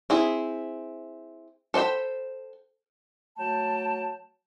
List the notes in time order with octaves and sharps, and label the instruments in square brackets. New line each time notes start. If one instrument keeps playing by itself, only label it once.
[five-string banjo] C4 E4 G#4
A4 C5 D#5 G5 B5
[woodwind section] F#3 A3 G5 A5